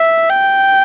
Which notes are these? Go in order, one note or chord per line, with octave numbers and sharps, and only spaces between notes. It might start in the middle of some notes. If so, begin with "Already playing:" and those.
Already playing: E5
G5